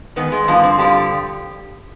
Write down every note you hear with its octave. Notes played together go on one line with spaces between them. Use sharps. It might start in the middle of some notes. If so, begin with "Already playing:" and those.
G#2 D#3 B3
G#3
C4
G2 D3 F3 B3
C4
G2 D3 F3 G4